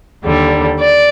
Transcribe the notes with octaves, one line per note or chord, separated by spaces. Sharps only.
D#2 D3 G3
D5